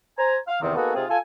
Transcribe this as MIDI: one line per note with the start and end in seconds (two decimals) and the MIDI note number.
0.18 0.37 72
0.18 0.37 80
0.18 0.37 82
0.48 0.60 77
0.61 0.74 40
0.61 0.74 48
0.61 0.74 51
0.76 0.92 58
0.76 0.92 59
0.76 0.92 63
0.76 0.92 66
0.76 0.92 68
0.76 0.92 69
0.94 1.04 48
0.94 1.04 60
0.94 1.04 63
0.94 1.04 65
0.94 1.04 68
1.09 1.17 65
1.09 1.17 69
1.09 1.17 80